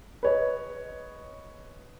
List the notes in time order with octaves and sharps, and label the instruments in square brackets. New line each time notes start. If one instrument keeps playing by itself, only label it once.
[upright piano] B4 C#5 D#5